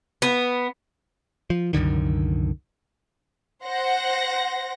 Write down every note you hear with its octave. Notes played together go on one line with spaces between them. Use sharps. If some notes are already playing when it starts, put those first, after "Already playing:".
B3
F3
C2 F#2 D3 D#3
C5 F#5 A#6